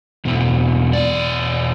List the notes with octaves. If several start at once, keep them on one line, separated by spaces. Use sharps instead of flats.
E2 B2 A3
D5